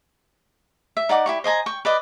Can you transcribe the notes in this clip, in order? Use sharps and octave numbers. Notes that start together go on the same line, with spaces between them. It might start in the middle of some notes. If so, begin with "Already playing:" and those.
E5
D#4 D5 F#5 D6
E4 G4 C#6
C5 D#5 G#5 A#5
G5 C#6
B4 D5 D#5